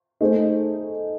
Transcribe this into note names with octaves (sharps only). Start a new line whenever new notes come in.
A3 D#4 G#4 C5